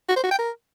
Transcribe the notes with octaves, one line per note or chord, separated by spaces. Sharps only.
F#4
C5
F#4
G5
A#4